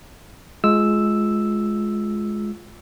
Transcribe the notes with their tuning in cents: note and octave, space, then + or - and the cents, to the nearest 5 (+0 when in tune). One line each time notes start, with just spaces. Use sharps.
G#3 +20 F4 +0 E6 +0